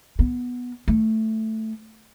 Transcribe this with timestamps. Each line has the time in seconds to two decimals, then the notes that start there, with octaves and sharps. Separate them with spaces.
0.19 B3
0.88 A3